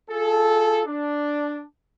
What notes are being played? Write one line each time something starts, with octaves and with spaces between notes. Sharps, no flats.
F4 G#4 A4
D4